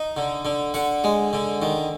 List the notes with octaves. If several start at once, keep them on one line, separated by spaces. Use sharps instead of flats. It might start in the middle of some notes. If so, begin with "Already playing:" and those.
Already playing: D#4
D3
D3
D3 F#5
G#3
D3
D#3